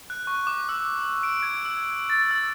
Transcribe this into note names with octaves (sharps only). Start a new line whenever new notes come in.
F#6
C#6
D6
E6
D7
G#6
E6
A6
E6